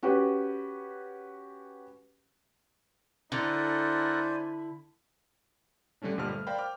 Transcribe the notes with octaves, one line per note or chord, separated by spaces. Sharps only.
C#4 F#4 G4 B4
D3 E4 A4 A#4 C5 D5 F#5 G#5
D3 G3 A3 C#4 D4
G1 A#2 G3 C5 A5 F6
A3
A#4 C5 D5 F5 G5 B5
G5 D6 F6